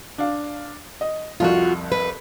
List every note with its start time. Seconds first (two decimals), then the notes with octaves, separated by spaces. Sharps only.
0.18 D4 F5
1.01 D#5
1.40 C2 F2 F4 F#4
1.92 B4